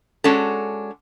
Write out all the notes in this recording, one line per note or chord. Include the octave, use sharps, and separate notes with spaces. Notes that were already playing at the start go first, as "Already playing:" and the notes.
G#3 C#4 D4 F#4 A4